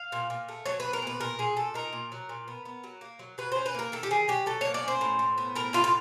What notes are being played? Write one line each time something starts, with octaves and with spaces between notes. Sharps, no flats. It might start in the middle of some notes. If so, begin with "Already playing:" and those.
Already playing: F5
A#2
A#2
A3
F#3 C#5
B4
B3
A#4
A#2 B4
A#2 A#4
A#2 G#4
A#2 A4
D#4 A#4
A#2
F#3
A#2
B3
B3
F#3
A#3
F#3
F#3 B4
C#4 C5
B4
A#3 A#4
D#3 A4
G4
D#3 G#4
F#3 G4
F#3 A4
A#3 C#5
D5
C#4
C5
A2
A2
B3
A2 A#4
A2 F4
F4